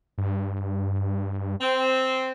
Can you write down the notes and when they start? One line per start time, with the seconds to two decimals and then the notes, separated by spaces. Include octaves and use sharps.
0.18 G2
1.61 C4